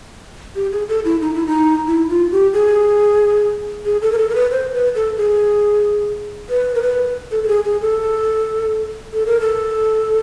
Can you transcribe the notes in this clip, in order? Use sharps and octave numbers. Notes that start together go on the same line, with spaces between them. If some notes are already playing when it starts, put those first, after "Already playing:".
G4
G#4
A4
E4
D#4
E4
D#4
E4
F4
G4
G#4
G#4
A4
A#4
A4
A#4
B4
C5
B4
A4
G#4
B4
A#4
B4
A4
A4
G#4
G#4
A4
A4
A#4
A4